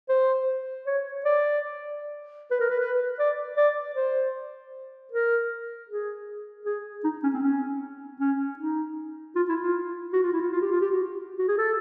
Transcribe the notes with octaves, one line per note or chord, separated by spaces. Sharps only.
C5
C#5
D5
B4
A#4
B4
B4
D5
D5
C5
A#4
G#4
G#4
D#4
C#4
C4
C#4
C#4
D#4
F4
E4
F4
F#4
F4
E4
F4
F4
G4
F4
G4
F#4
F#4
G#4
A4